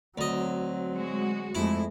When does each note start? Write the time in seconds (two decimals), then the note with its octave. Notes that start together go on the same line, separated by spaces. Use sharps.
0.18 D2 F#3 C4 D#5
0.97 G#3 F#4
1.55 F2 G#3 A3 E4